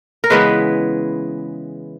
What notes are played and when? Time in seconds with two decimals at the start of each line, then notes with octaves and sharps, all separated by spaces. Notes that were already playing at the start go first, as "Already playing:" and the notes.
0.24 A#4
0.30 C#3 E3 G#3 B3 B4